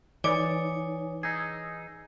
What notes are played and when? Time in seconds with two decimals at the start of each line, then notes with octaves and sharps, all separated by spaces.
0.24 E3 D#4 C#5 D5 G#5
1.23 D#4 G#4 E6